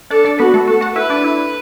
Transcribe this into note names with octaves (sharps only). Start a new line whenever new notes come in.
D4 A4 D5
D4 D5
B3 F#4 B4
A3 A4
F#4 A4
F#4 F#5
E4 B4 E5
D4 D5
E4